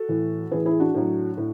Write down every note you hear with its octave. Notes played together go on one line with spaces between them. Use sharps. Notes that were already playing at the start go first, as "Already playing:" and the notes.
Already playing: F#4 A4
A2 E3
A2 E3 G#4 B4
E4 G#4
D4 F#4
A2 F#3
A2